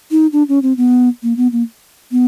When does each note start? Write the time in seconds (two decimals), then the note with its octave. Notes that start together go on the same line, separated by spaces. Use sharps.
0.11 D#4
0.33 D4
0.49 C#4
0.62 C4
0.77 B3
1.23 A#3
1.37 B3
1.52 A#3
2.12 B3